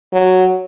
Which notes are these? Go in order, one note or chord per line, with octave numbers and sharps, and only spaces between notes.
F#3